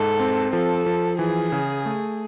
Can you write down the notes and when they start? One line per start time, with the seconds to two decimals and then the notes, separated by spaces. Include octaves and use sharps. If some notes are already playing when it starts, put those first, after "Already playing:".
Already playing: G#2 A4
0.20 C4
0.53 F3 A4
0.86 F3
1.19 E3 G#4
1.52 C#3
1.86 A3